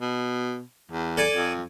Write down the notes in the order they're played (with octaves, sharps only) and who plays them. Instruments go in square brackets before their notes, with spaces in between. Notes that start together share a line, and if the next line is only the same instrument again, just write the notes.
[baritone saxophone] B2
E2
[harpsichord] A4 D5 G#5
[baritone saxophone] F2